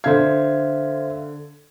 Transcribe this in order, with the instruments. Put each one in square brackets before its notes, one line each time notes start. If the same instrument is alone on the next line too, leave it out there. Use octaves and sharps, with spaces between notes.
[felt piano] D3 G#6 [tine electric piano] C5 E5 F5